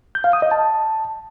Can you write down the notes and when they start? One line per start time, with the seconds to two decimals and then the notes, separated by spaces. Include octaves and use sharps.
0.15 G6
0.24 F5
0.33 D#6
0.42 D#5
0.51 A5